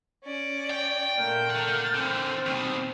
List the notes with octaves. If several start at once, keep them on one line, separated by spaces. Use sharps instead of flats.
C#4 D5
G5
A#2 A3 A#3 F6 G6
A4 F#5
D3 E3 C4
D#2 B2